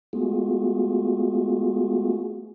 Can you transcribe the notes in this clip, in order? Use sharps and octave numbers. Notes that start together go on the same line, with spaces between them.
G#3 A3 B3 F4 F#4 G#4